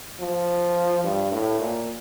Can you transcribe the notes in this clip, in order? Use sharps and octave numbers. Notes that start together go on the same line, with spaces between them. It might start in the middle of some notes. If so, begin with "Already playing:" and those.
F3
G2
A2
A#2